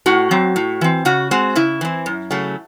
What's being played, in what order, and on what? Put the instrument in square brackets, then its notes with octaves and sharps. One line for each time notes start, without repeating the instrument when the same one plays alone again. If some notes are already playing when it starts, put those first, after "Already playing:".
[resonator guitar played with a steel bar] A2 F#4
F#3 C4
A2
E3 C4
C#3 F#4
G#3 C4 F#4
C#3 E4
E3 C4
F#2
C#3 F#3 A3